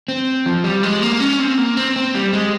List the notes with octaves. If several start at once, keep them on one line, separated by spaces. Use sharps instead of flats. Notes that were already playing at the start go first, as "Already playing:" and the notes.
C4
F3
G3
G#3
A#3
C#4
C4
A#3
C4
C4
G3
G#3